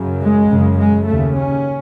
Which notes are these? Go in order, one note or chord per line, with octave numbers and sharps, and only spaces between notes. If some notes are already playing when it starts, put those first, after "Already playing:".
Already playing: F#2 C#3
G#3
F#2 C#3
G#3
D#2 C#3 A3
C#4